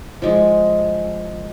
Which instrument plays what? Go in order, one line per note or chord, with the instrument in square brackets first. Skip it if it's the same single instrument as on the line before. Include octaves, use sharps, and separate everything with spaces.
[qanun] F3 G#3